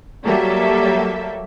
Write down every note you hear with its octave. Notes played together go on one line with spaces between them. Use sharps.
F#3 G3 A#3 G4 A4 E5